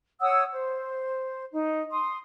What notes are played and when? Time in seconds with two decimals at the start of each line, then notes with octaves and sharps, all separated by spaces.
0.21 C#5 F#5 D#6 E6
0.51 C5
1.52 D#4
1.91 C6 D#6